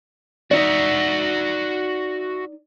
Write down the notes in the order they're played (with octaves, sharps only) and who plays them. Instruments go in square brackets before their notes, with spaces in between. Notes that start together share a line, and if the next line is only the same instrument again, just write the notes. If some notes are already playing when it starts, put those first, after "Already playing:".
[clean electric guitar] D#4 D5 [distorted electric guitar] F#4 E5